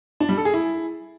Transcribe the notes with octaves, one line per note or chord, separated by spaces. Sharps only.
D4
G3
A4
G#4
E4